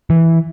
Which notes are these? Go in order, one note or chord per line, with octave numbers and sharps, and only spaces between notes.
E3